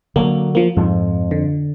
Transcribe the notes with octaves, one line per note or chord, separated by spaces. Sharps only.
D3 F#3 A#3
F3 A#3
F2 G#2 F3
D3